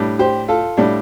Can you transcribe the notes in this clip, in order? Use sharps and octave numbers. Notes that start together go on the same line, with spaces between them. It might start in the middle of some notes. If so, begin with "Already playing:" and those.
Already playing: A2 G3 D4
G4 C5
F4 A4
A2 G3 D4